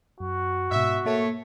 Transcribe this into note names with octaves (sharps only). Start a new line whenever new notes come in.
F#2 F#4
G#2 B2 E5
A3 A#3 C#5